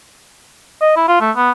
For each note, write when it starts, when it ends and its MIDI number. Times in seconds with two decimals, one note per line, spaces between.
0.82 0.91 75
0.96 1.06 64
1.08 1.19 65
1.21 1.31 57
1.36 1.51 59